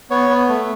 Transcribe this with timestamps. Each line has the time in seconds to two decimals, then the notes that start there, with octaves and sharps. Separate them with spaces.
0.10 B3 C#5
0.29 B3
0.48 A3